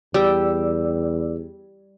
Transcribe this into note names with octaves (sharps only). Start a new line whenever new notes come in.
E2 G3 D5 G5 E6